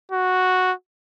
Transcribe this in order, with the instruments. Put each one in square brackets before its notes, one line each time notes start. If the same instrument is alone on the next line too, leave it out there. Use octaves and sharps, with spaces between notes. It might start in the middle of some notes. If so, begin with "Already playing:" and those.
[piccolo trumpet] F#4